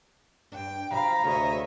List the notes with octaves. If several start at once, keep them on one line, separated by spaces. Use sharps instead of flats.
G2 D4 G5
C3 F3 F#3 F5 A#5 B5
D2 C3 F4 G#4 C#5 D#5 E5